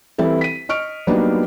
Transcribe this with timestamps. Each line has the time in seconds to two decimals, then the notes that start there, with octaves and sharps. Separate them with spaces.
0.18 E3 G3 C4 E4 A4
0.41 B6 D#7
0.69 D#5 C#6 F6 D7
1.07 F#3 G3 A#3 B3 D4 D#4